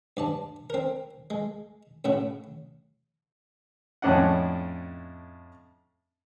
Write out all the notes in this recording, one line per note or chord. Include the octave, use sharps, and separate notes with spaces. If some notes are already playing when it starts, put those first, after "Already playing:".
G2 D5 A5
C4 A#4
G#3
A2 C#3 E4 F#4
F2 A2 C#4 D4 D#5 F#5